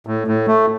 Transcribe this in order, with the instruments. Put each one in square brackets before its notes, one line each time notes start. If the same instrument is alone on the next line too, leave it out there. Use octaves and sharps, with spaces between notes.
[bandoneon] A2
A2
A3